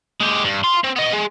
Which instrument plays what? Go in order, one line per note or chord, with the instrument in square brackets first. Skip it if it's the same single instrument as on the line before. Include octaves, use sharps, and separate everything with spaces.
[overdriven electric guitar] G#3 G4
G2
F5 C6
C4
B3 D#5
G#3